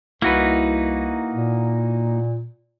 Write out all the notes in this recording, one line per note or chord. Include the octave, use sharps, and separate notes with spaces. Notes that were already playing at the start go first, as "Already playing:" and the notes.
C2 A#3 D#4 E4 F#4 B4
A#2